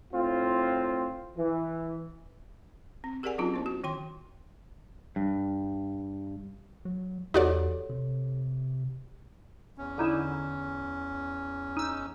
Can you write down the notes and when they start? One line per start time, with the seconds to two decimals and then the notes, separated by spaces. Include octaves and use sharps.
0.14 A2 C4 F4
1.38 E3
3.04 C4
3.23 G4 G#4 A#4 D5 F#5 G#5
3.38 F#3 C4 C#4 D#4 F4 F#4
3.54 B3 E4 C5
3.66 F#4
3.84 D#3 G5 C6
5.16 G2
6.85 F#3
7.34 E2 D#4 F#4 G4 A4 C#5 D5
7.90 C3
9.78 E2 C#4
9.98 D3 D#4 E4
11.77 D#4 E6